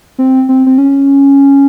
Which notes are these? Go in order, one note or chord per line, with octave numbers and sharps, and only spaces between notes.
C4
C4
C4
C#4